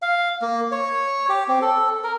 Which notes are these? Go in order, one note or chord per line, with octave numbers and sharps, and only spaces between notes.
F5
A#3
C#5
G4
C4
A4
A#4